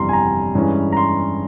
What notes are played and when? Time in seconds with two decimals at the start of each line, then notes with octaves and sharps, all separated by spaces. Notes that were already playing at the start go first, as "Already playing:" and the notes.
Already playing: G1 F2 C3 E3 G3 A#5 C6
0.09 G#5
0.13 A#5
0.55 G2 E3 G#3 C#4
0.92 A#5
0.97 C6